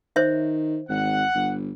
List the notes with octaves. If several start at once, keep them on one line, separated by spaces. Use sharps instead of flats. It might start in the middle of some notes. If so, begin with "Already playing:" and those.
D#3 C5 C#5 E5
G#1 F#5
G1